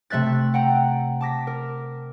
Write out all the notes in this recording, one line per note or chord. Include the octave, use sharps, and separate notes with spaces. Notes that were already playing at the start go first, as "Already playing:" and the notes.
C3 A3 E5 F#6 A6
F#5 G5 A#5
A5 D6 A#6 B6
A#4